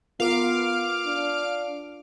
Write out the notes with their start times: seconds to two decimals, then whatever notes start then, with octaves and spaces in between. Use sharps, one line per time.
0.20 B3 F4 A#4 F5 D6
1.06 D4